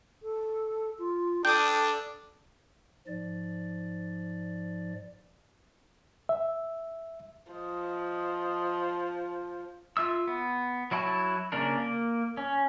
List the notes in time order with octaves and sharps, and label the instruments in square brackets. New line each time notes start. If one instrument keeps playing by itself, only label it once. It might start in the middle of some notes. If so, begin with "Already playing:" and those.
[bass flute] A4
F4
[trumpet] D4 [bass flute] A4 [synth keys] G5 D6 D#6 [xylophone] G6
[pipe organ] G#2 F3 D5
[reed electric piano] E5
[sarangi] F3 [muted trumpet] D#5
[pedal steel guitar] F4 E5 E6
B3
F#3 E4 F#4 A5
C#3 A#3 D4 A#4
A#3
C#4